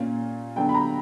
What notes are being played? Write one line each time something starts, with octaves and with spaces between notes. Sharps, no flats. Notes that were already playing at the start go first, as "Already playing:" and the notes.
Already playing: A#2 A#3 C#4
D3 F#3 B3 G5
B5
A#5